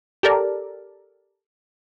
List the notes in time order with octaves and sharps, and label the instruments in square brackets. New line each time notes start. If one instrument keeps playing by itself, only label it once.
[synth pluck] G4 A4 A#4 D5